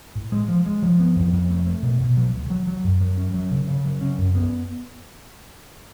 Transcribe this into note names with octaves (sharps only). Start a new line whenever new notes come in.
A2
G#3
F3
G#3
F3
B3
F2
F2
A3
A3
B2
B2
F#3
D2
F#3
F#3
F#2
F#3
C#4
F#3
C#3
C#3
F#3
C#4
F#2
B3